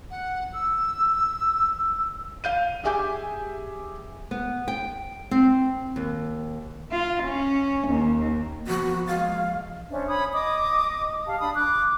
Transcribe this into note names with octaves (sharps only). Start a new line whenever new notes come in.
F#5
E6
F5 G6 D#7
G4 G#4 E5 G#5 D6 G6
B3
G5
C4
D#2
F4
C#4
D#2
F3 A#3 B3 F#4
G#3 G#4 F5 A6
C#4 D4 C5 E5
C#5 B5 D#6
D#5 D6 D#6
G4 F5 A5
D4 B5 D#6
D6 F#6